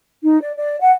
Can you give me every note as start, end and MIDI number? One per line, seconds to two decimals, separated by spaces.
0.22 0.39 63
0.40 0.52 74
0.55 0.78 74
0.79 0.91 78